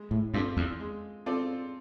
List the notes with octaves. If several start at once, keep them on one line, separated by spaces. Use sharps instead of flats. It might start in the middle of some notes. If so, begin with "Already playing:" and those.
Already playing: G#3
A2
G2 C4 F4 A4 D5
E2
G#3
C4 F4 A4 D5